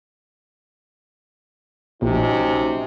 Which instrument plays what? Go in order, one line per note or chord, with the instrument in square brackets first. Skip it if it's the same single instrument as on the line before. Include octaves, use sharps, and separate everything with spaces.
[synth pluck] A#1 [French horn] C3 [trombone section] F#3 C#4 D#4